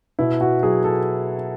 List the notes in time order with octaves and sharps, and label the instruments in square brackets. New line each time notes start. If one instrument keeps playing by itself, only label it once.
[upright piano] B2 E4
F#4
F#3 G#4
A4